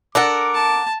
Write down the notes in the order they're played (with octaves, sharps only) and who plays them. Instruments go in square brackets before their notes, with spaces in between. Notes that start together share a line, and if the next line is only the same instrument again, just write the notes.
[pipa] D4 A4 [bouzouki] A#4 F#5 [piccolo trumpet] D6
[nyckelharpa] A5